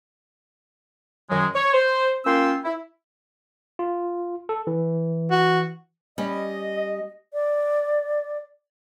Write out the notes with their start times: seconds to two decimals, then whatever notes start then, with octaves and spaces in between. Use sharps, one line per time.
1.30 F#2 D#3 F#3 G#3
1.55 C#5
1.73 C5
2.25 A#3 C#4 F4 G5 C6 E6
2.64 E4
3.79 F4
4.49 A4
4.67 E3
5.31 F#4
6.18 G3 C#4 D#5
7.34 D5